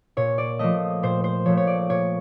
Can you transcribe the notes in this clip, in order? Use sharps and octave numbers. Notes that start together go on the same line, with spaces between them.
A#2 C#5
D5
F3 A3 D#5
A#2 C5
C5
F3 A3 C#5
C#5
D5
A#2 C#5